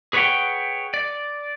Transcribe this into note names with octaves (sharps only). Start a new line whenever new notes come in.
G#4 B4 C#5 D#5 F#5 G5
D5